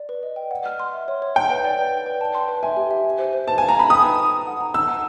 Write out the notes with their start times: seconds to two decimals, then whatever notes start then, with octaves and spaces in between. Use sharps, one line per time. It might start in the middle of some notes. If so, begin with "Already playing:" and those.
Already playing: D5
0.09 B4
0.23 D#5
0.36 G5
0.51 F#5
0.66 F6
0.80 C6
0.93 E5
1.08 C#5
1.22 C#5
1.35 F#5 G5
1.50 B4
1.64 D5
1.79 B4
1.92 B4
2.06 B4
2.21 A5
2.35 C6
2.48 B4
2.63 E5 G#5
2.77 G4
2.91 E5
3.05 E5
3.19 C5
3.33 C5
3.48 B4 A5
3.58 F5 G#5
3.69 A#5
3.76 A5 B5
3.90 G5 D#6
4.03 B4
4.18 G5
4.32 A#5
4.47 F#5
4.61 A#5
4.74 A5 E6
4.88 F#5